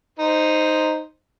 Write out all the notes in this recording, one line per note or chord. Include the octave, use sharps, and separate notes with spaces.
D#4 C5